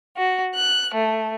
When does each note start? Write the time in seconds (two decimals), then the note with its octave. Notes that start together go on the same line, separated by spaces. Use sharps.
0.17 F#4
0.56 F#6
0.94 A3